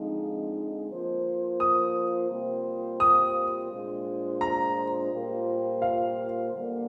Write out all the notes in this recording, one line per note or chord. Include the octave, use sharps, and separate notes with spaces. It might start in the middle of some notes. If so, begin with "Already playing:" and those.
Already playing: D3 F3 G#3 C4 D#4
F3 A#3 F4 C5
D#6
C3 G3 A#3 F4 C5
D#6
A#2 G#3 D4 F4 C5
A#5
A#2 G3 A#3 F4 C5
F5
D3 G3 A#3